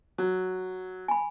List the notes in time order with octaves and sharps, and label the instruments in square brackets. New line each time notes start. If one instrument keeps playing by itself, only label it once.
[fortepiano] F#3
[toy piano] G#5 B5